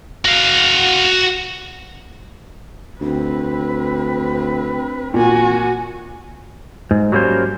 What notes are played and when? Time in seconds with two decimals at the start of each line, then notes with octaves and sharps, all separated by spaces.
0.25 F#4 F5
3.01 D2 C4 B4
5.14 A#2 F#4 G#5
6.91 G#2
7.12 F#3 G3 A#3 C#4 C5